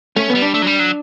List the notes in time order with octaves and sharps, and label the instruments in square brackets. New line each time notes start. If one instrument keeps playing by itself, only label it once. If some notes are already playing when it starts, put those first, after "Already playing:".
[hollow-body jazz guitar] A3 [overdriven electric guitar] C#4
[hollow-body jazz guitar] B3
[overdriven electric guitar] G3
[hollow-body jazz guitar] D4
[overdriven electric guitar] A3
F#3
G3
F#3